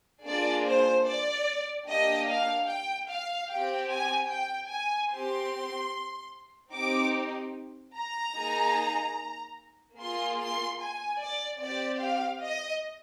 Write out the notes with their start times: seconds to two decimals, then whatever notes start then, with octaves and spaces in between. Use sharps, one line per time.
0.25 A#3 D4 F4 G#4 D5
0.66 C5
1.06 D5
1.87 A#3 D4 G4 D#5
2.28 F5
2.68 G5
3.08 F5
3.49 C4 G4 G5
3.90 G#5
4.30 G5
4.70 G#5
5.11 C4 G4 C6
6.74 C4 D#4 G4 D6
7.95 A#5
8.36 A#3 D#4 G#4
9.98 A#3 F4 G#4 C6
10.38 C6
10.79 G#5
11.20 D5
11.60 C4 G4 D5
12.01 F5
12.41 D#5